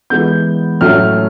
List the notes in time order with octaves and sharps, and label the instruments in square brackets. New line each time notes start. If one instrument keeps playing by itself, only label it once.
[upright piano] E3 G#3 B3 G6
A2 F#3 A3 C#4 F6